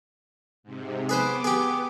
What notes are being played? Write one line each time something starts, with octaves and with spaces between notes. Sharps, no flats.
G#2 C3
B3 G#4 B4 C5 D6
G4 G#4